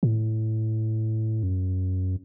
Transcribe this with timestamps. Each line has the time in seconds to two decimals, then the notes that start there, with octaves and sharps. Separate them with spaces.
0.03 A2
1.43 F#2